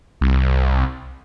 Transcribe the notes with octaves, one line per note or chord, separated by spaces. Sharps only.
C2